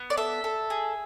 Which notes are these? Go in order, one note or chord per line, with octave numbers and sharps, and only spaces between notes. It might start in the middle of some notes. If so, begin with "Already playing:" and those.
Already playing: B3
D5
A4 E5
A4
G#4